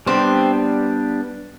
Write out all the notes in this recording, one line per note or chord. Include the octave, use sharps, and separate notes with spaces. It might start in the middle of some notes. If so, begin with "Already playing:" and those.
G3 B3 C4 D4 G4